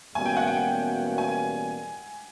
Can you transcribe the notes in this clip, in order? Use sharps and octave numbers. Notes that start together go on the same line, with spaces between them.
E2 B2 G3 A#3 C#4 G#5
G5
F#5
G5
G#5